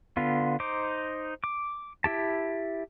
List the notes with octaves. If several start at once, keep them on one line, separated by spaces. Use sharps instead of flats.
D3 B3 F4
D#4 C5 D6
D6
E4 G4 A5